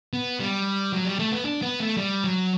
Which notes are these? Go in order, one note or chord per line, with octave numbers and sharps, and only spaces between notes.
B3
G3
F#3
G3
A3
B3
D4
B3
A3
G3
F#3